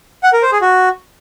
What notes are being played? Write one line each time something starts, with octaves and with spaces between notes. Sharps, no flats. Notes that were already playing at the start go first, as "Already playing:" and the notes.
F#5
A#4
C5
G#4
F#4